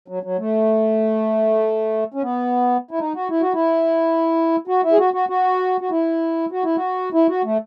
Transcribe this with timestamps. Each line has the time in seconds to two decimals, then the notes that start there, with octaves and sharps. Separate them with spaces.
0.08 F#3
0.23 F#3
0.38 A3
2.14 C#4
2.22 B3
2.91 E4
2.99 D#4
3.14 F#4
3.30 E4
3.41 F#4
3.53 E4
4.67 F#4
4.83 E4
4.92 G#4
4.98 F#4
5.14 F#4
5.29 F#4
5.81 F#4
5.90 E4
6.52 F#4
6.64 E4
6.76 F#4
7.13 E4
7.29 F#4
7.44 A3